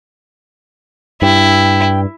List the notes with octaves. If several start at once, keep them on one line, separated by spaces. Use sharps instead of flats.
G2 E4 G5